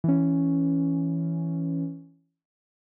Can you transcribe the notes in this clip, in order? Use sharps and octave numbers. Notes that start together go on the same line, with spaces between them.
E3 C#4